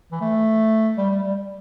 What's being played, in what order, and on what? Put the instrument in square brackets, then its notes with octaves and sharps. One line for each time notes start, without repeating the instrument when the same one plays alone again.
[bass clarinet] E3
A3
G3
G3
G3